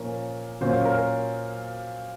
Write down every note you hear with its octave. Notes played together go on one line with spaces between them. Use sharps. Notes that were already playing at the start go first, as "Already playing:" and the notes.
Already playing: A#2 F3 A#3 C#4
A#2 F#3 A#3 C#4 C5
A#4